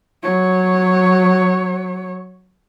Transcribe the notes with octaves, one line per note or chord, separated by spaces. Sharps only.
F#3 C#5